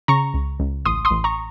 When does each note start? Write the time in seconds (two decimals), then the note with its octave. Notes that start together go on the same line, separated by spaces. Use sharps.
0.08 C#3 A#5 C#6
0.34 C#2
0.60 C#2
0.85 A1 C6 D#6
1.05 C6 D#6
1.11 A1
1.24 A#5 C#6